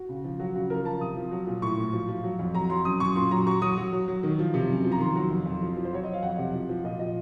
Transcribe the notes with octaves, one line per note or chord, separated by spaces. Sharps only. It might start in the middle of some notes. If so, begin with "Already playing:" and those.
Already playing: F#4
C#3
F3
F#3 F#4
C#3 F#4
F3 A#4
F3 A5
C3 D#6
F3
F#3
A#2
A2 C#6
A2
F3
F3
F#3
F2
F#3 A#5
F#3 C6
F#2 D#6
F#2 C#6
A#2 C6
F#3 A#5
F#3 C#6
F#3 D#6
F#3
F#3
F#3
D#3
F3
C3
F#2
F3
A#5
D#3 C6
F#3
F2
F2
F3
F3
C5
F#3 C#5
F#3 D#5
F5
F2 F#5
C3
F3
F3
A#2 D#5
F3 D#5